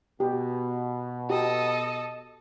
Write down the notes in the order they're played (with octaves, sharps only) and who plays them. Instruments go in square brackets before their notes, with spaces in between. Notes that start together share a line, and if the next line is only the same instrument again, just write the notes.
[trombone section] B2 [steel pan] G4
[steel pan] F#4 G4 A#5 [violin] A4 D#5